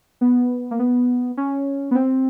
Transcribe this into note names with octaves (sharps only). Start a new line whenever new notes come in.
B3
A#3
B3
C#4
B3
C4